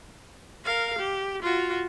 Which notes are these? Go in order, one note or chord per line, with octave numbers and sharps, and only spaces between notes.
A#4 F5
G4
F4 F#4